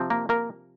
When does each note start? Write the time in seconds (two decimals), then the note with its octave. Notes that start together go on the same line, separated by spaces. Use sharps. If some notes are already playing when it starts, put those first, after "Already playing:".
Already playing: C3 F3 C4
0.10 A#3 A#4
0.29 A#3 A#4